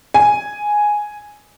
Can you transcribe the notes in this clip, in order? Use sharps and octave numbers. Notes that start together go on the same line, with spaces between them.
G#5